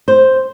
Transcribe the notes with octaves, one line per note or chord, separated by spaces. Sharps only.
C5